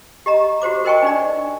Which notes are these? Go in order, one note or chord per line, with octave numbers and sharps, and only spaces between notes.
G4 D#5 A#5
F#4 G4 C5 D6
A#4 C5 D#5 G5 A5 C#6
D4 D#4 D5